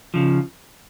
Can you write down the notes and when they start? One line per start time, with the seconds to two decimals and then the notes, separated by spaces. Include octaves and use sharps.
0.14 C#3 F3